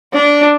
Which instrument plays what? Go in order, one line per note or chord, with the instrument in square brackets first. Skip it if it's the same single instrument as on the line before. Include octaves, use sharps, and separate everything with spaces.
[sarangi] D4